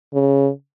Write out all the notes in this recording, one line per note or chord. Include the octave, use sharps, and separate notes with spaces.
C#3